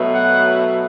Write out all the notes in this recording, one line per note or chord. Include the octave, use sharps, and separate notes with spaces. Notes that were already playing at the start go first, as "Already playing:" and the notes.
Already playing: B2 F#3 A3
F#5